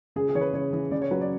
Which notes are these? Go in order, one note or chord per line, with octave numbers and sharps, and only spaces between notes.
C#3 G#4
G#4
E3 C#5
B4
C#3 C#5
E3
C#3 D5
C#5
F#3 B4
D5